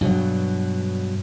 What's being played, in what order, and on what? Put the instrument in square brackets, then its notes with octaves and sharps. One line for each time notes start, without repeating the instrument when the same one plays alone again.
[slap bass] G2 B2 F#3